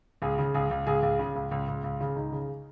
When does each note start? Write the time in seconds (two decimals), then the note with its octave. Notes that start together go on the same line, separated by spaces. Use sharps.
0.22 C#2 G#4
0.39 C#3
0.54 C#2 G#4
0.71 C#2
0.87 C#2 G#4
1.03 C#2
1.19 C#3
1.36 C#2
1.51 C#2
1.68 C#2
1.84 C#2
2.01 C#3
2.16 C#2 D#4
2.32 C#3